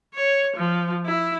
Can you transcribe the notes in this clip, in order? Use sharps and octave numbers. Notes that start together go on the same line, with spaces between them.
C#5
F3
E4